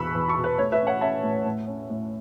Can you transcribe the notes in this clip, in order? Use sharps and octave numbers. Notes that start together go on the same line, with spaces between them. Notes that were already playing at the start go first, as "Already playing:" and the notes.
Already playing: E2 B2 B5 C#6 E6 F#6
E2
A5 C#6
B2
B4
A3 C#5
B4 E5
C#4
C#5 F#5
C#4 E5 A5
A2
A2
C#4
A2